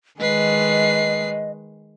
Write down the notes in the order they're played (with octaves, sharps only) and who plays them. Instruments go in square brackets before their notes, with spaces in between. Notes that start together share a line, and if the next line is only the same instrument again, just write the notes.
[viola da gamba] D#3 G#3 [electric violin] B4 C7 [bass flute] D#5